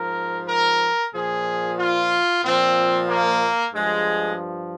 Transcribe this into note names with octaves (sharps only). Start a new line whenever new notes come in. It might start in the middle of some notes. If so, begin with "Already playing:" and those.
Already playing: G#2 F3 A#4
A#4
A#2 F3 G#4
F4
A#2 F3 C4
A#3
G2 F3 G#3